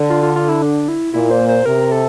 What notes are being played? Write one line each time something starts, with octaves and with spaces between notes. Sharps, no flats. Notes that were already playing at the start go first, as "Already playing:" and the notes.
Already playing: D3
F4
F4
F4
E4
D4
E4
A#2 E4
C5
C5
C3 A#4
A4